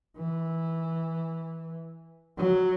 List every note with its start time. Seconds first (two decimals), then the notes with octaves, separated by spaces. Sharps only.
0.17 E3
2.38 F#3